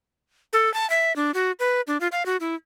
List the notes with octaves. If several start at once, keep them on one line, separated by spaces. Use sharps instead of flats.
A4
A5
E5
D4
F#4
B4
D4
F4
F5
F#4
E4